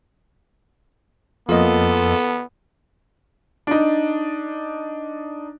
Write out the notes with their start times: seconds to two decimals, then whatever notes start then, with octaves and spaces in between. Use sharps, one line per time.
1.49 F2 A#3 B3 F4 A4 D#5
3.67 D4 D#4